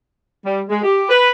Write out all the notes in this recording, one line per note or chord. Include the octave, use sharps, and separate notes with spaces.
G3
G#3
G4
B4